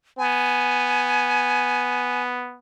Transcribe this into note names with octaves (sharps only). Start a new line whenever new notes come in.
B3 G#5